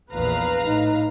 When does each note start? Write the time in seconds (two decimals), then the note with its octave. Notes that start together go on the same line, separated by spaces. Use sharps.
0.13 A#1 E2 B4 F5 A#5
0.66 A2 D#4